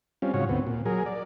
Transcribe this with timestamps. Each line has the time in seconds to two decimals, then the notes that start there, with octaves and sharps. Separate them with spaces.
0.22 G3 C4 C#4 F4
0.34 G#2 C#3 F4 F#4 C#5
0.49 D2 B3 C4
0.67 A#2
0.86 F#3 G#4 A#4
1.06 D5